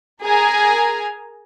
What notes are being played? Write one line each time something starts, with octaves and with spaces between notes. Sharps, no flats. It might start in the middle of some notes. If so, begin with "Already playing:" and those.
G#4 A#4 G#5 A#5